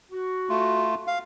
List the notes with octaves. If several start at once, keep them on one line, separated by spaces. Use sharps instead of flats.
F#4
A3 F4
F5